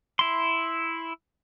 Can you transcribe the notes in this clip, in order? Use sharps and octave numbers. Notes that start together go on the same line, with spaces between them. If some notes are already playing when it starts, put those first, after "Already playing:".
E4 C6